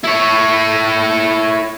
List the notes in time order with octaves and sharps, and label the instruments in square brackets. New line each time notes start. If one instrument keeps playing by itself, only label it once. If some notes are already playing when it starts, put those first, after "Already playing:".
[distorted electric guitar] E4 C#5